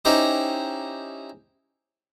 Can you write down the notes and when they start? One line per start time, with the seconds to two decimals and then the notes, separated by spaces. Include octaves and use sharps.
0.05 C#4 D#4 E4 G4 C5 D#5